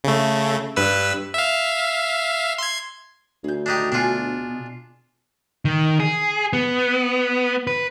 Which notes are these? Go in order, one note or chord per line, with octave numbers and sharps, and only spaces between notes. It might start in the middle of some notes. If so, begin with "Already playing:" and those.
C#3 A3
G2 B4 E6
E5 F5
C6 G#6
D2 G#4 G6
D4 D#4 G4 D5
B2 D4 F4 G#4 D5 G#5
D#3
G#4
B3
B4